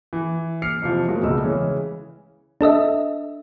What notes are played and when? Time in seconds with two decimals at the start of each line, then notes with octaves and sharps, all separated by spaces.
0.13 E3
0.62 D6 F6 C7 C#7
0.82 F2 C3 E3 F3
1.08 E3 F#3 G#3 A#3 F#4
1.23 E1 C#2 A3 D#5 E6
1.44 C#3 E3 G#3 C#4
2.61 D4 A4 D#5 E5